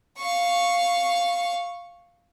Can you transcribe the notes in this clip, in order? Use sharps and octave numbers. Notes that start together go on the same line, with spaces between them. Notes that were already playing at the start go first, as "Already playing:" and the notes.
F5 C#6